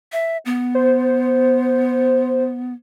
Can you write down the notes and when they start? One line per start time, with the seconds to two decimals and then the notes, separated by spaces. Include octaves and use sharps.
0.12 E5
0.46 B3
0.75 C5